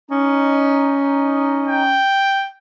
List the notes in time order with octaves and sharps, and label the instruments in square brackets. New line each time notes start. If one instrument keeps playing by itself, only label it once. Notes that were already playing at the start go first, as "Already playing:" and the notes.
[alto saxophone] C#4 [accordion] D#4 D#5
[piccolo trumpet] G5